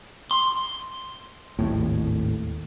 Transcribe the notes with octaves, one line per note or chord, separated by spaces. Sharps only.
C6
G#1 D#2 A2